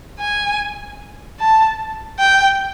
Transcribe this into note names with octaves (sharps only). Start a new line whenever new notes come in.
G#5
A5
G5